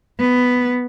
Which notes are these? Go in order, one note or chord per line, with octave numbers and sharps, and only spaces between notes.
B3